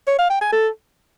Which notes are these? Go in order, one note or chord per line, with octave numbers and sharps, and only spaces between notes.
C#5
F5
G5
G#5
A4